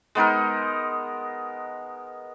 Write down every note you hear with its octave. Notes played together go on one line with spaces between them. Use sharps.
G#3 B3 D#4 A#4